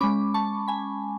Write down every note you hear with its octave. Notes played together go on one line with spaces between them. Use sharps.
G#3 C#4 B5 D6
A5 C#6
G#5 B5